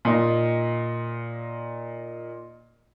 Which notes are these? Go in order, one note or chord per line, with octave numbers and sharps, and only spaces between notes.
A#2 D#4